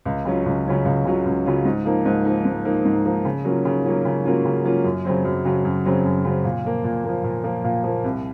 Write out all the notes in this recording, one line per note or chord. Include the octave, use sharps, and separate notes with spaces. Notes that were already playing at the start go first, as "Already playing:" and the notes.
C#2
C#3 F#3 C#4 F4
C#2
C#3 F#3 C#4 F4
C#2
C#3 F#3 C#4 F4
C#2
C#3 F#3 C#4 F4
G#2
F3 A#3 D#4
G#2
F3 A#3 D#4
G#2
F3 A#3 D#4
G#2
F3 A#3 D#4
C#3
F#3 A#3 C#4 F4
C#3
F#3 A#3 C#4 F4
C#3
F#3 A#3 C#4 F4
C#3
F#3 A#3 C#4 F4
F#2
C#3 F#3 C4
F#2
C#3 F#3 C4
F#2
C#3 F#3 C4
F#2
C#3 F#3 C4
A#2
F3 A#3
A#2
F3 A#3
A#2
F3 A#3
A#2
F3 A#3
C2